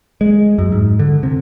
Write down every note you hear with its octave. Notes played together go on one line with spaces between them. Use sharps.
G#3
F#2
G#2
D3
C3